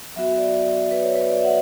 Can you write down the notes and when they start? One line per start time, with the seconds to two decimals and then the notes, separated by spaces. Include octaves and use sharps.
0.16 F#3 B3 F#4 E5
0.38 D5
0.91 B4
1.02 C#5
1.16 B4
1.30 D5
1.41 E5
1.44 F#5